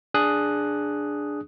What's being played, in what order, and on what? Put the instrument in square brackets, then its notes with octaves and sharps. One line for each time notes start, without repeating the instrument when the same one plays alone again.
[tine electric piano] D4 G#4 D#6 F#6